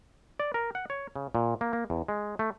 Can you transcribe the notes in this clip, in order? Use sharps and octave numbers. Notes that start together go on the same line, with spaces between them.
D5
A#4
F#5
C#5
C#3
A#2
A#3
A#3
E2
G#3
A3